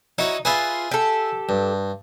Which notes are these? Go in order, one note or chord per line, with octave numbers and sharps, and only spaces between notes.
D#4 E4 F#4 C#5
F4 G#4 B4 E5 F5
G4 A4
G2